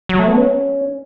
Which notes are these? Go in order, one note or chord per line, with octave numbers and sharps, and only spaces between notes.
F#3
A3
B3
C#4